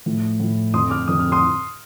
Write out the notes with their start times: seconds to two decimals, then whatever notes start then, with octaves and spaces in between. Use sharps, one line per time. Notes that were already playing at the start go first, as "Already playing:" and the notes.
0.06 A2 F3
0.40 A2 F3
0.74 F2 D3 F3 C6 D#6
0.90 D6 F6
1.08 F2 D3 F3 D#6
1.20 F6
1.32 C6 D#6